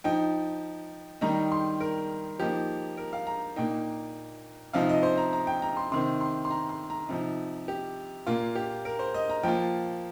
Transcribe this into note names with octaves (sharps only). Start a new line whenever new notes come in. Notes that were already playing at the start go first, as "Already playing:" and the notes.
F3 D#4 G5
D#3 G3 D#4 A#5
C6
A#4
F3 A#3 D#4 G4
A#4
F5
A#5
A#2 A#3 D#4 G5
C3 F3 D#4 F5
D#5
C5
A#5
A#5
G5
A#5
C6
C3 D#3 C4 C6
C6
C6
A#5
C6
A#5
C3 F3 D#4
G4
A#2 A#3 F4
G4
A#4
C5
D#5
A#5
F3 A#3 F4 G5